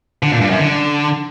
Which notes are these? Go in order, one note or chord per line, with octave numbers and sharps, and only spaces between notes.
D3
A#2
G2
F#2
D3